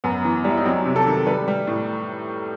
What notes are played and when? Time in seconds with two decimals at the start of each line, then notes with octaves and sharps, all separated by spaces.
0.04 F#2 B3
0.25 E3
0.44 G3
0.50 E4
0.57 D#4
0.65 F#3 C4
0.85 C3
0.96 A4
1.06 D#3
1.26 G3 B4
1.48 G3
1.67 A2